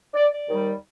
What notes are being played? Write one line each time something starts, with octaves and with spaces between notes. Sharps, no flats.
D5
D5
D#2 D#3 G3